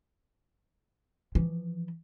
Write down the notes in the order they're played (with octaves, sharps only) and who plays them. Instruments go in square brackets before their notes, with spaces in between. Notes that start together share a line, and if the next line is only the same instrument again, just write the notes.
[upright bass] E3 F3